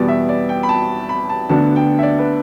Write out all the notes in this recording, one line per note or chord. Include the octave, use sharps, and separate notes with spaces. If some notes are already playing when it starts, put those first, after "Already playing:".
Already playing: E2 B2 G3 B3 D5
E5
D5
G5
B5
A5
B5
A5
D2 D3 B3 D4 A5
G5
E5
D5
B4